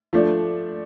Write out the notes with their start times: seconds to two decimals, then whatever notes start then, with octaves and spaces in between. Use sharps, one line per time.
0.13 F3 A3 D4